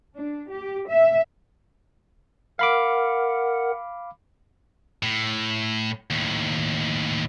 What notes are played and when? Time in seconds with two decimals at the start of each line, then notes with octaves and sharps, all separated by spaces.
0.15 D4
0.50 G4
0.88 E5
2.59 A#4 F5 F#5 B5 D6
5.03 A2
6.11 D#2 A2